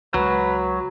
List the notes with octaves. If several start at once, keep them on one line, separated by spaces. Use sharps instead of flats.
C#2 F#3 G#3 B4